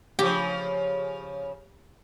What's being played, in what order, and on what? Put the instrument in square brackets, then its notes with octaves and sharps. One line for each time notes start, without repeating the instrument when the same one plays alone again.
[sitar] C#3 F3 [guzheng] G4